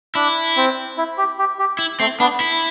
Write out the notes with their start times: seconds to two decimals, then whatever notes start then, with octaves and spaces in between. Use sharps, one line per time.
0.15 D4 E4
0.57 C4
0.98 E4
1.18 G4
1.39 G4
1.59 G4
1.79 E4
2.00 A3 C4
2.20 B3 D4
2.40 E4